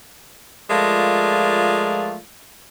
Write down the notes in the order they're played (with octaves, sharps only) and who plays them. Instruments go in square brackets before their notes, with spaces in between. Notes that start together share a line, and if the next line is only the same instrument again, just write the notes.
[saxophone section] F3 G#3 A3 F4 A#4 D5